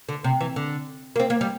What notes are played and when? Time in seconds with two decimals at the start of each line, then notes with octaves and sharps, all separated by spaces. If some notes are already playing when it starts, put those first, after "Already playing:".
0.09 D3
0.24 C3
0.41 E3
0.56 D3
1.16 A#3
1.20 C4
1.30 A#3
1.41 G3